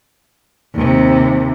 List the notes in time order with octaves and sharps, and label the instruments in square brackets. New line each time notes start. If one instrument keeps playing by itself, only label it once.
[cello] D#2 C3